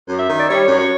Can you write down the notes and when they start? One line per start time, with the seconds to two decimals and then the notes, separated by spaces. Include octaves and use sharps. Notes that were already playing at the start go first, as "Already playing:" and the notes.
0.09 F#2
0.18 E5
0.29 D#3
0.39 D5
0.49 G3 C#5
0.68 F#2
0.78 C#5